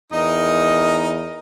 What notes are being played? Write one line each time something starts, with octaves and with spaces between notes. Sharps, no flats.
E2 D#4 A#4 D#5